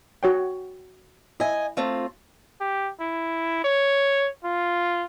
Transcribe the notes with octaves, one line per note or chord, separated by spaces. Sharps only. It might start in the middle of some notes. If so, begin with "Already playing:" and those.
F#4 C#5 G5
E4 D#5 E5 G#5
A3 C4 F4
G4
E4
C#5
F4